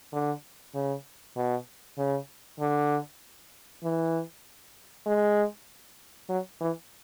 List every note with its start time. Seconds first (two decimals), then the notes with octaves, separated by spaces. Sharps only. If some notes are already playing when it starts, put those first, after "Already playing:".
0.13 D3
0.75 C#3
1.36 B2
1.98 C#3
2.60 D3
3.83 E3
5.06 G#3
6.29 F#3
6.60 E3